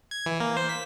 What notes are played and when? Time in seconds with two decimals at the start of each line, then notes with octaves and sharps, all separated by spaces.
0.11 G#6
0.26 E3
0.40 A#3
0.57 C5
0.69 B6